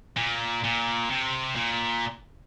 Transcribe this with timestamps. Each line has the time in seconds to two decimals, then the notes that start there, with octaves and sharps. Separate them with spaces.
0.17 A#2
0.64 A#2
1.11 C3
1.56 A#2